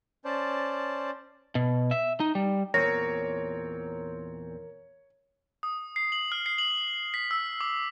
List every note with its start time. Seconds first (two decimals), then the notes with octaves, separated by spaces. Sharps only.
0.25 C#4 C5 D5 A5
1.55 B2
1.91 E5
2.20 D#4
2.35 G3
2.74 E2 A#2 C4 A#4 C#5 A#6
5.63 D#6
5.96 C7
6.12 F#7
6.32 F6
6.46 C7
6.58 F#7
7.14 B6
7.31 E6
7.61 D6